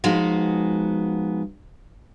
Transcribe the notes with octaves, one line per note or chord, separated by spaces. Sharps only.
F3 G#3 B3 D#4 F#4